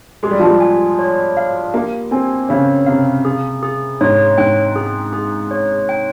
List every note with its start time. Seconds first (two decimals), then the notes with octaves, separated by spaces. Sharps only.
0.23 G#3 G4
0.31 G3
0.39 F3
0.46 G3
0.60 G#5
0.99 C#5
1.37 F5
1.74 A#3 G4
2.11 C4 G#5
2.49 C#3 C#5
2.86 C3 F5
3.25 G#4
3.63 G#4
4.01 G#2 C#5
4.38 G#2 G5
4.76 G#4
5.13 G#4
5.51 C#5
5.89 G5